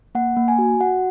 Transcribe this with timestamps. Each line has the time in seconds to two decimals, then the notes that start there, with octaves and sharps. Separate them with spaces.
0.15 A#3 F#5
0.37 A#3
0.48 G#5
0.59 F#4
0.80 F#4 F#5